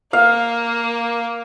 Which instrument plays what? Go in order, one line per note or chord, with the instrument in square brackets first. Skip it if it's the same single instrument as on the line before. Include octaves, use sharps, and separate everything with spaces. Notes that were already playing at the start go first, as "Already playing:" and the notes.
[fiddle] A#3 [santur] F5